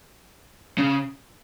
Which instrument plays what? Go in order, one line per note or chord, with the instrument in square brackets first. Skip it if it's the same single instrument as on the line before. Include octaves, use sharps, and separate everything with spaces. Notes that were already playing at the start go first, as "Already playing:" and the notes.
[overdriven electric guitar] C#3